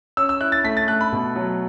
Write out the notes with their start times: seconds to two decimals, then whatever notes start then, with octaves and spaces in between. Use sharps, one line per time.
0.17 C#4 E6
0.29 E6
0.41 E4 F#6
0.52 A6
0.64 A3 B6
0.77 A6
0.88 A3 F#6
1.01 B5
1.12 B2
1.36 F#3